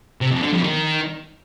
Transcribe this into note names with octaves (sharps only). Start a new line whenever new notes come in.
C3
F2
D3
F2
D#3